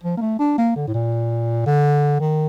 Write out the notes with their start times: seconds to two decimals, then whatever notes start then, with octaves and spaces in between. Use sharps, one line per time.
0.03 F3
0.17 A#3
0.21 A3
0.39 D4
0.58 A#3
0.76 D3
0.88 A2
0.94 A#2
1.66 D3
2.20 D#3